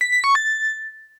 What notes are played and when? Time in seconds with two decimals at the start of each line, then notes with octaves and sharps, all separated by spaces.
0.01 B6
0.12 B6
0.24 C#6
0.35 A6